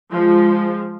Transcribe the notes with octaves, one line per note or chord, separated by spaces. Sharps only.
F3 G#3